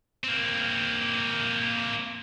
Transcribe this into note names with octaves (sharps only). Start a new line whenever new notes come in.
A#3 C4